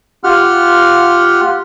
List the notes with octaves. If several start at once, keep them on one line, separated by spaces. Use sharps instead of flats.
F4 G4 F#5 F6